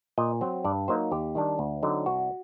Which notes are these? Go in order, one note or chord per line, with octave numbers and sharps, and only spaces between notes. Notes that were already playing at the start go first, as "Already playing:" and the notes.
A#2 D#5
F#3 C4
G2 D5
F#3 A#3 D#4 C5
D#2 G4
D#3 G3 D4
D2
D3 F#3 C4 D#4
C2 F#4